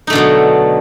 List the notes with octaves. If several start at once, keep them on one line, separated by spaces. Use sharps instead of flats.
B2 D3 F#3 A3 D#4